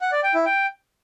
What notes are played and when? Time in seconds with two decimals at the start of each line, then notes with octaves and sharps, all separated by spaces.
0.01 F#5
0.12 D5
0.23 G5
0.34 E4
0.46 G5